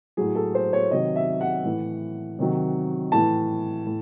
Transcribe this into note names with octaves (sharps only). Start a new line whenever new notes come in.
A2 F#3 G#4
A4
C5
C#5
C3 D#3 F#3 D#5
E5
F#5
A2 E3
C3 D#3 F#3
A2 E3 A5
A2